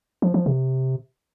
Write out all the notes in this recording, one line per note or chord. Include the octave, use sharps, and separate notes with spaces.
F3
F3
C3